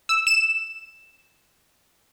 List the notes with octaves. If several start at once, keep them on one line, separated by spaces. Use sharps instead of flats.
E6
E7